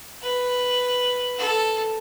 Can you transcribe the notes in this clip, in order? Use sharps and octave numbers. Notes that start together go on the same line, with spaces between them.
B4
A4